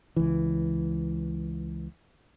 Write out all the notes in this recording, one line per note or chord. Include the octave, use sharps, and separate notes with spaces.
C#2 E3